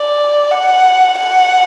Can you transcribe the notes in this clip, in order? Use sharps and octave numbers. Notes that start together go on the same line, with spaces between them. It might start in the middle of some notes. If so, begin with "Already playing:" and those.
Already playing: D5
F#5
F#5